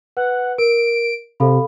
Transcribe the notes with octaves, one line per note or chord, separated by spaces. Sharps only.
B4 F#5
A#4 D7
C3 A4 F5 B5